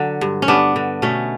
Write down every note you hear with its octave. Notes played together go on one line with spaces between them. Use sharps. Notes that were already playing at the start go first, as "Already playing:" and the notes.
Already playing: D3 F#3
G2
C#4
G2 B3 D4
D3
B2 A3 C#4